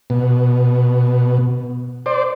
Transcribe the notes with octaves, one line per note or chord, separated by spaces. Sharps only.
B2
C5 D5